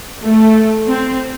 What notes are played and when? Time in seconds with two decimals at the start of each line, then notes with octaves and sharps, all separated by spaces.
0.23 A3
0.87 C4